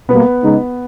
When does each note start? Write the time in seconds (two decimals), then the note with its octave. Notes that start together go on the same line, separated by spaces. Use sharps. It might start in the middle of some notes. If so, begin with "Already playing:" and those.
0.09 B2 G3 A#3 B3 B4
0.43 C#3 G#3 D#4